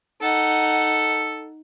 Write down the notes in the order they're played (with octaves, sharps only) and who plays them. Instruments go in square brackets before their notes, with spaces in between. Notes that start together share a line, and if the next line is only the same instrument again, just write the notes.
[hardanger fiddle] D#4 F#5 [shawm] A4